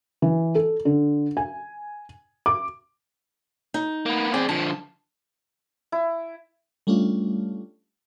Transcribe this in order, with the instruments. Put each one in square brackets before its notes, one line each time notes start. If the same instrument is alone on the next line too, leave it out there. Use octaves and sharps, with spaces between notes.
[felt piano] E3
A4
D3
G#5
D6
[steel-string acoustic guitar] D#4
[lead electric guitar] A#3 B3
[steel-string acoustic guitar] C4 [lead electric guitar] G#4 D5
[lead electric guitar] D3 F3 [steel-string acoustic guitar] A5
[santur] E4
[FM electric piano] G3 A3 C#4 D4 F4